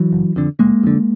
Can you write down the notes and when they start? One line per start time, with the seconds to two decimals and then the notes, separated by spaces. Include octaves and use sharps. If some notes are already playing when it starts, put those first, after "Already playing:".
Already playing: E3 F#3
0.12 F#1
0.36 F2 D3
0.59 F#1 G#3 A#3
0.83 F2 D3